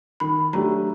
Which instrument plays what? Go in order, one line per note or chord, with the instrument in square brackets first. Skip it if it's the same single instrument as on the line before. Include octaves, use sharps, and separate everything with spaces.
[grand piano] D#3 [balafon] B5
[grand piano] F#3 A3 D4 G4 [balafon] A#5